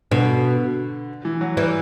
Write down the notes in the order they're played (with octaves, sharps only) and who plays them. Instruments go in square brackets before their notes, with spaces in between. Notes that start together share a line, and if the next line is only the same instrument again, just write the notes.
[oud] B2 [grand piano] D3
[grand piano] E3
F#3
[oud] E3 [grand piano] G3